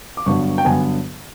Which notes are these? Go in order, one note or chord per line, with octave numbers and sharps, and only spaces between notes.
D6
G2 D3 F#3 B3 C#6
G5
G2 D3 F#3 B3 G#5